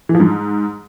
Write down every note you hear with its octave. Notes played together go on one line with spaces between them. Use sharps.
E3
F3
G#2